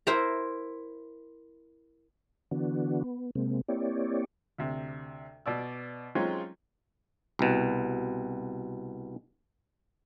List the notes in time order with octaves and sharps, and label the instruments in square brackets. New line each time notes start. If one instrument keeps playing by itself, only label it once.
[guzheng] E4 A#4 C5 A#5
[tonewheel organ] D3 E3 B3 D4 F#4
B3
C3 G#3 A#3 C4
A#3 C4 E4 G4 C#5 D5
[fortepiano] D2 C3
B2 D5 E6
F#3 G#3 C4 C#4 D#4 F4
[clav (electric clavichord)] C2 B2